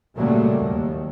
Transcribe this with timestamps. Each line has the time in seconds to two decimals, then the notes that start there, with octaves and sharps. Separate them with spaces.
0.15 A#2 C#3 F#3 G3 A3 A#3
0.58 D#2